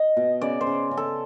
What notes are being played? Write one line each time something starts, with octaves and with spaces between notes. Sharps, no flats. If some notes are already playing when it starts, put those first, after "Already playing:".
Already playing: D#5
B2
C#3 D5
C5
C#3
C#3
A4